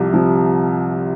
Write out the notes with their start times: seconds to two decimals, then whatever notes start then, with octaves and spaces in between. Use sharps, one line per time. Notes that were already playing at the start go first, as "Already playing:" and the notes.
Already playing: C2 C3 F3
0.13 C3 F3